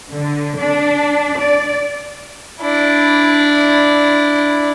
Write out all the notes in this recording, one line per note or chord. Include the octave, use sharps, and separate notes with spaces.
D3
D4
D5
D4 E4